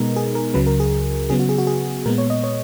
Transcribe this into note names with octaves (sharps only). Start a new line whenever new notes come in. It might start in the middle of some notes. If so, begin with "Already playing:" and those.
Already playing: B2 G#3 B3 D#4 A#4
G#4
A#4
C#2 C#3 F#3 B4
A#4
G#4
C#3 F#3 B3 G#4
F#4
G#4
F#4
G#4
A#2 G#3 B3 A#4
C#5
D#5
C#5